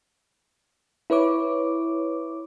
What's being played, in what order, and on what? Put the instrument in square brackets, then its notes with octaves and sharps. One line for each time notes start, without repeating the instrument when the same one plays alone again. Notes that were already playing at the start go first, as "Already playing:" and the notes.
[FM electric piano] E4 B4 C#5 D6